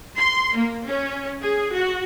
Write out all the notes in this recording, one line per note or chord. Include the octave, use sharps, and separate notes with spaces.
C6
A#3
C#4
G#4
F#4